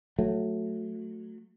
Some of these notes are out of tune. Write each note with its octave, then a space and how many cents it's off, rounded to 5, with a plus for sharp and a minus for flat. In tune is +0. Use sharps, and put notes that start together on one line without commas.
F#3 -20 A3 +0